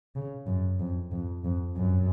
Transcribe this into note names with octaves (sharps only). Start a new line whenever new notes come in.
C#3
F#2
F2
F2
F2
F#2